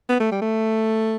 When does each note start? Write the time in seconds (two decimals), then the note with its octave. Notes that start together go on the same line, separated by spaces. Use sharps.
0.09 B3
0.20 A3
0.31 G3
0.42 A3